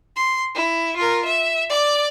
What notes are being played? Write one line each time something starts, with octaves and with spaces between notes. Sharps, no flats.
C6
E4
F4 A#4
E5
D5 D6